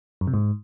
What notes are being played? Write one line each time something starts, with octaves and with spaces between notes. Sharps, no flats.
F#2
C3
G#2